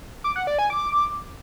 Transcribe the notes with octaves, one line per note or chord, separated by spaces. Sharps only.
D6
F#5
D5
G#5
D6